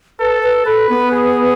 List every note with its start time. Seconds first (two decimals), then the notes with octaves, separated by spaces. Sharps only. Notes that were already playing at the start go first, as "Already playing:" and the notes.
0.20 A4 B4
0.43 B4
0.66 A4 B4
0.90 B3
1.12 G#4